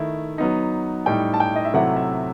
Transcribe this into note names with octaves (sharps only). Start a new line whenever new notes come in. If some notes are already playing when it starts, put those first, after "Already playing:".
Already playing: D#3 A3 E4
F#3 B3 D#4
A2 G3 D#4 G5
A5
G5
D#5
E5
C3 F#3 A3 E4 F#5
E5